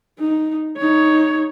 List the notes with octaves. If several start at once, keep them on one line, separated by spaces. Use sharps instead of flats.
D#4
D#4 C#5